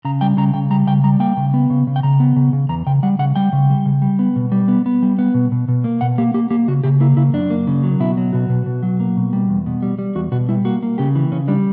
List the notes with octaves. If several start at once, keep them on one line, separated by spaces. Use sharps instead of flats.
C#3 A#5
G3 G5
C#3 A#5
C#3 G5
G3 A#5
C#3 G5
G3 A#5
A#3 G5
C#3
B3
C#3
C#3
G5
C#3 A#5
B3
C#3
C#3
E2 A#5
C#3 G5
G3 F#5
C#3 F#5
G3 G5
C#3
G3
C#3
G3
B3
B2
G3
B3
B3
G3
B3
B2
B2
B2
A#3
B2 F#5
A#3 G4
A#3 G4
A#3 G4
C#3 F#4
C#3 G4
A#3 E4
C#3 E4
F#2 D4
A#3
C#3
F#3
B2 E4
F#3
B2 F#4
B2
B2
F#3
A#3
B2
G3
E2
B2
G3
G3
E2 F#4
B2 F#4
G3 E4
A#3 F#4
A#3
C#3 G4
E3
C#3 C#4
G3 D4